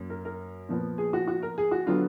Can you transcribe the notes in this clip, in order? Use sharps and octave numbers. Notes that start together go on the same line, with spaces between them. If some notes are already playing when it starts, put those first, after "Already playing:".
Already playing: F#2 A#3
A#4
A#4
A#2 F3 B3
G#4
F#4
F#4
A#4
G#4
F#4
D3 F#3 B3 F4